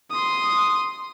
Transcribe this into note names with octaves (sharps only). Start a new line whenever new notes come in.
C6 D#6